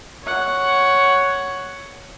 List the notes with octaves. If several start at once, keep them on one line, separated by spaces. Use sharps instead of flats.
C#5 F#5